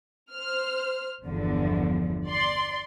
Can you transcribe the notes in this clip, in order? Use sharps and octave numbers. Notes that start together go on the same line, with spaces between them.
C5 F6
G1 E2 D3 F3
D5 C6